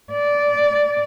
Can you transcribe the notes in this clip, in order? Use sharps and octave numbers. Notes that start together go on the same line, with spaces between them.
D5